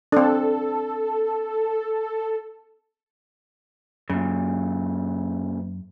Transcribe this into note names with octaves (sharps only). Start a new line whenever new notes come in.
C4 D4 A4
F#2 A#2 C#3